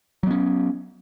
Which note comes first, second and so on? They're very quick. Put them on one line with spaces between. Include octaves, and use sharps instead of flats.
F#3 B3 C#4